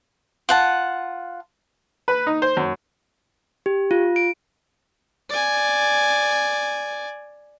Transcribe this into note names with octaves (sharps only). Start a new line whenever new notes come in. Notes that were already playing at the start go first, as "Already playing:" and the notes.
F4 F#5 A5
B4
D#4
C5
F#2
G4
F4
D7
D5 G#5